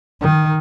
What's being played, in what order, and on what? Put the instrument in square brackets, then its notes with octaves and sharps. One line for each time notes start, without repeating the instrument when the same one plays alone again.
[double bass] D#3